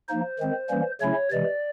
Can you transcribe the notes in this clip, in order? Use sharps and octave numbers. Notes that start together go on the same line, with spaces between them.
F3 A#3 D#4 C5
D#3 G#3 C4
E3 G3 A#3 C#4
C#3 F#3 A3 C#4 E4 C#5
C3 E3 G#3 D5